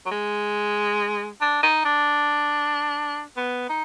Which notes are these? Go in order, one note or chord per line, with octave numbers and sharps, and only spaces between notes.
F#3
G#3
D4
D#4
D4
B3
D#4